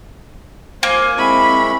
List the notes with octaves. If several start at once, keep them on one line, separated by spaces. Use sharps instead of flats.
A#3 C5 G#5
G#3 C4 E4 B5 C#6